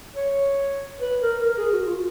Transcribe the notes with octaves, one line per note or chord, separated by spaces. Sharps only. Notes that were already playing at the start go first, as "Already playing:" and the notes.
C#5
B4
A#4
A#4
G#4
F#4
F4